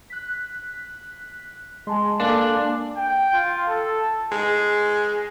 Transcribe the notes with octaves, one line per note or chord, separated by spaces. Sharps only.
F#6 B6
G#3 G#5 A5 C6
A#3 D4 A4
G5
F4
A4
G#3